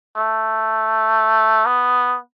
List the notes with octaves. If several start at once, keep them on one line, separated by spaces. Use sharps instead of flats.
A3
B3